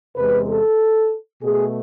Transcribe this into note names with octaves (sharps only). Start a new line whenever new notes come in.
E2 C3 G#3 B4
A4
B2 A3 G#4